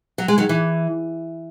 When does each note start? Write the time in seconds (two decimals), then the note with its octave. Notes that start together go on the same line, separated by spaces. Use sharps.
0.18 F#3
0.28 G#3
0.38 D#3 F#3
0.49 E3